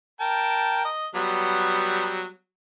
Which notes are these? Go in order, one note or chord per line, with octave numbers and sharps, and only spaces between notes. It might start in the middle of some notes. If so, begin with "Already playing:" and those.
A#4 G5 A5
D#5
F#3 G3 B3